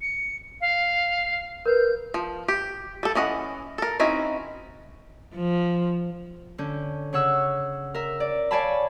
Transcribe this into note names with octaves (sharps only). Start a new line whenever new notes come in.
C#7
F5
A#4 B4 G6
F3
G4
G3 A4
E3 C#4 D#5 F#5
A4 A#4
C4 C#4 D#4 E4 F#4
F3
D3 C#4 G6
C#3 C#5 F#5 E6
A#4 E5
D5
C#5 D5 F5 G#5 A5 B5